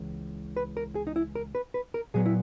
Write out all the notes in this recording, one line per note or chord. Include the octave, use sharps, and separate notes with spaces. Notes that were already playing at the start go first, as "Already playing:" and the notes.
Already playing: C#2 E3
B4
A#4
G#4
D#4
E4
A#4
B4
B4
A#4
A#2 F#3 B3 G#4
E4